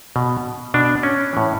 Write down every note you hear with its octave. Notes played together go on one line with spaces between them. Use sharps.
B2
B2 D4
C#4
A2 E3